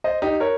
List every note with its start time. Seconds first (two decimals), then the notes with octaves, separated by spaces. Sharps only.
0.04 C5 D#5
0.22 D#4 G4
0.40 A#4 C#5